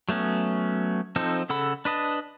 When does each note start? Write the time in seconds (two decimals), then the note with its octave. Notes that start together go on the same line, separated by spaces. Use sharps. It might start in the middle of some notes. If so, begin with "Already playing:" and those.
0.09 F#3 A3 B3 C#4
1.16 F3 C4 D#4 A4
1.49 C#3 A4 F#5 B5 E6
1.85 D4 B4 D#5 A5